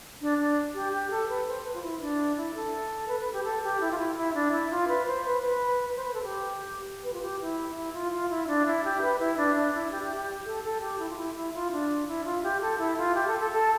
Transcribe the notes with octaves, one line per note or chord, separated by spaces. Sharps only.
D4
D4
G4
G4
A4
B4
C5
B4
F4
E4
D4
E4
A4
B4
B4
G4
A4
G4
E4
F4
E4
E4
D4
E4
F4
B4
C5
B4
B4
B4
C5
B4
A4
G4
B4
F4
G4
E4
E4
F4
F4
E4
D4
E4
G4
B4
E4
D4
D4
E4
G4
G4
G4
A4
A4
G4
E4
F4
E4
E4
F4
D4
E4
F4
G4
A4
E4
F4
G4
A4
A4
A4